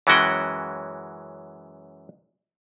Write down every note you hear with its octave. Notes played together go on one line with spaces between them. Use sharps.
F#2 E3 G#3 C#4 F#4 G5